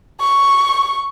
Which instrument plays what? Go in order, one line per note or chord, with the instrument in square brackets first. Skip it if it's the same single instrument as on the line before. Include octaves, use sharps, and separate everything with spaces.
[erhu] C#6